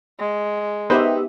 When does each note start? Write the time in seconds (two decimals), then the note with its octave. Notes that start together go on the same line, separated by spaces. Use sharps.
0.20 G#3
0.90 B3 D#4 G4 B4 C5 E5